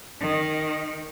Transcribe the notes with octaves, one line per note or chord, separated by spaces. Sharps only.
D#3